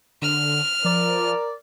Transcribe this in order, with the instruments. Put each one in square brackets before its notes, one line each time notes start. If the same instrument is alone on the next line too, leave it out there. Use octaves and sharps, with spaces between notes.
[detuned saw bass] D3 [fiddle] F6
[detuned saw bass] F3 [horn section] A#4 D5